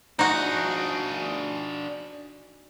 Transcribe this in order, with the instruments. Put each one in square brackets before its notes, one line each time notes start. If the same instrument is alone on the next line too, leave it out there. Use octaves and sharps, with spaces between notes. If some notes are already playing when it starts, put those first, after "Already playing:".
[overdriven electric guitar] D4 G#4 [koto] D#4 F#4